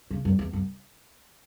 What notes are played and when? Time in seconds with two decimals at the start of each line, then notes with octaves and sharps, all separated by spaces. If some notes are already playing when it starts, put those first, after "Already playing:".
0.11 C#3
0.25 F#2
0.39 E2
0.53 F#2